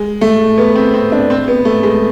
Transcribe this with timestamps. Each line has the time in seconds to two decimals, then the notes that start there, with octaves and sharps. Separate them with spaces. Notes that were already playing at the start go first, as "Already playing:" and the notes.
Already playing: G#3
0.21 A3
0.58 B3
0.75 C4
0.94 C4
1.12 D4
1.30 C4
1.48 B3
1.65 A3
1.83 G#3